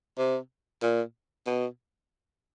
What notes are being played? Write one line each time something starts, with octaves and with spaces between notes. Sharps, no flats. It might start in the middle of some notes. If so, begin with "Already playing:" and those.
C3
A#2
B2